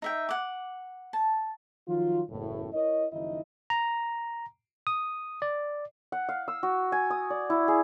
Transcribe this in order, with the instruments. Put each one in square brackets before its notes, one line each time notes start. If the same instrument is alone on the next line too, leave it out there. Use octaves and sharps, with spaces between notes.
[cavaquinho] D#4 E5 G5
F#5 D6
A5
[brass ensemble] D#3 F3 F#3 F4
F#1 E2 A2
E4 A#4 C#5 D#5
F#1 D#3 F3 D#4 E4 D#5
[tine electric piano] A#5
D#6
D5
[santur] F#5
F5
E6
F#4
G#5
D#6
D5
E4
G#4